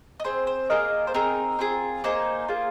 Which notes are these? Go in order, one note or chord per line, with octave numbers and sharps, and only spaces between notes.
D#5
C4 G#4 C5
C5
A#3 F4 G#4 A#4 D#5
C5
C4 D#4 G#4 A#4
C4 F4 G#4
A#3 D#4 G#4 C5
A#3 F4 G#4